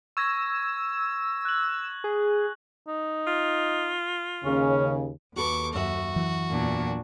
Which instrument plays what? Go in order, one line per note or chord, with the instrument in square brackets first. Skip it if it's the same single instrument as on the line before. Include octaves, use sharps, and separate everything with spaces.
[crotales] C#6 G#6 A#6 [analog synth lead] E6
[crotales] F#6 F#7
[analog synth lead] G#4
[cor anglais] D#4
[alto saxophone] F4
[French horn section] D#2 C#3 [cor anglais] C#4
[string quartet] D#2 [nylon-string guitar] F#4 A4 B4 [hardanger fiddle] C#6 D6
[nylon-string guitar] F#2 E5 [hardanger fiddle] F#4
[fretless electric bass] E3 F#3
[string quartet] E2 A#2 D4